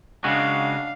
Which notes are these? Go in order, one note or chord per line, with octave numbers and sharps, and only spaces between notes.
C#3 G#3 D4 F#4 F5